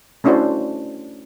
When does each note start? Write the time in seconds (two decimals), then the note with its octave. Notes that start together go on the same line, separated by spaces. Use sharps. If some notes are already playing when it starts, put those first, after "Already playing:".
0.24 A3 C#4 D4 E4 F#4 C5